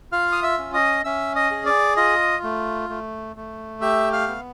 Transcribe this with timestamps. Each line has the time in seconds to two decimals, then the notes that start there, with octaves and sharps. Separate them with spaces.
0.12 F4 F5 F6
0.32 D#6
0.43 E5 E6
0.58 C#4
0.74 D#5 D#6
1.04 C#4 E5 E6
1.36 D#5 D#6
1.51 G#4
1.66 D5 D6
1.97 F4 D#5 D#6
2.43 A3
2.89 A3
3.36 A3
3.81 G4 E5 E6
4.13 F5 F6
4.27 B3